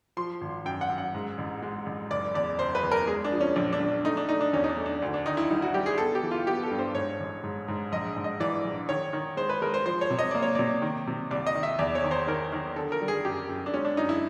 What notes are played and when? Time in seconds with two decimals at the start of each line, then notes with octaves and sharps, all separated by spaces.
0.17 F3 C6
0.41 G#1
0.65 F#2 G5
0.81 F#5
0.90 F#2
0.98 F#5
1.14 G#2
1.38 A1
1.62 G#3
1.86 A1
2.10 F#1 D5
2.34 E2 D5
2.59 F#1 C5
2.75 B4
2.83 E2
2.92 A#4
3.07 G#3 G#4
3.24 D4
3.32 F3
3.41 C#4
3.56 A#1 D4
3.73 D4
3.80 A#1
3.88 D4
4.05 A3 D#4
4.17 D4
4.29 A3 D#4
4.41 D4
4.53 E2 C#4
4.64 D#4
4.69 D4
4.77 A3
4.86 D4
5.02 D2
5.14 D4
5.26 D#3 D#4
5.37 E4
5.50 G3 D#4
5.62 F#4
5.74 G3 G4
5.86 G#4
5.98 B3 A4
6.15 G4
6.23 E3
6.31 F4
6.47 B3 G4
6.63 A4
6.71 G2
6.79 C5
6.95 G#2 C#5
7.20 A1
7.44 G#2
7.68 G#2
7.92 A#1 D#5
8.16 G#2
8.24 D#5
8.40 E3 D5
8.64 A#1
8.89 D#3 C#5
9.13 D#3
9.37 G#3 C5
9.49 B4
9.62 G#3 A#4
9.74 C5
9.86 F3 C5
10.01 C#5
10.10 C3
10.19 D#5
10.31 A#3 D5
10.43 C#5
10.55 C3 D5
10.82 D#3
11.07 C3
11.31 C2 D5
11.47 D#5
11.55 D#3
11.63 E5
11.79 E2 D5
11.95 C#5
12.04 D#3
12.11 C5
12.27 D#3 A#4
12.52 D#3
12.76 D3 A4
12.92 A#4
13.01 G3
13.08 G#4
13.24 F#2 G4
13.49 F#2
13.66 D4
13.73 G#3 C#4
13.85 D4
13.97 F#2 D#4
14.09 E4